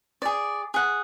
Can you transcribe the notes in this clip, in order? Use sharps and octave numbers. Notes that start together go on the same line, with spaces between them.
G#4 D5
G#4 F#5